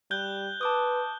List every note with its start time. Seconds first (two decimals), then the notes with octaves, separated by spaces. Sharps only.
0.11 G3 F#6 G6 G7
0.61 B4 A5 D6 D#6